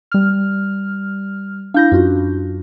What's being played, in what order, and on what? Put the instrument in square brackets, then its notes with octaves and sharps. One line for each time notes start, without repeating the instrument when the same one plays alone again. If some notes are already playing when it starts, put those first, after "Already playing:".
[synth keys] G3 F6
[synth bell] D4 E4 [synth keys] F5 G6 A#6
[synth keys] F#2 [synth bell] D4 F4 F#4